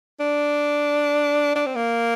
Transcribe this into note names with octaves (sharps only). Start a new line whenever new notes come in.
D4
D4
C4
A#3